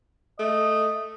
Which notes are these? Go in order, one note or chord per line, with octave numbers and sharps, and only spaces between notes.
A3 D#5